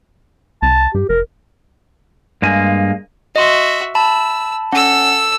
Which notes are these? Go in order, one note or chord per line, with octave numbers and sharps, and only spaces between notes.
C2 A5
G2 G4
F1 A#4
G2 G#3 A#3 G#5
F#4 D#5 E5 C6
A5 B5 E6
C#4 A4 F#5 E6